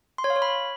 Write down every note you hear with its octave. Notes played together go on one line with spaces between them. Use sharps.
C6
C#5
F5
C#5
B5